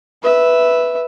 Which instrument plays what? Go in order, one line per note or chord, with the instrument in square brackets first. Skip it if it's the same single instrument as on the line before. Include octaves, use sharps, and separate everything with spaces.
[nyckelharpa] B4 E5